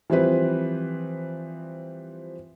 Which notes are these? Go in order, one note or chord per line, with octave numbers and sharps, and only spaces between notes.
E3 F3 G3 C4 B4